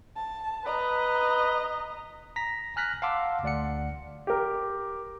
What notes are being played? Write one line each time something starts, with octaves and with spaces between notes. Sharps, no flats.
A5
B4 D#5 A#5
A#5 A#6 B6
G#5 F6 F#6 A#6 B6
F5 F#5 A5 C6 D6 E6
D2 D5 F#5 C#7
G4 A#4